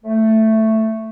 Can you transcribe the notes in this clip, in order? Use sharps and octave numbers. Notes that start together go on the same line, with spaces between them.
A3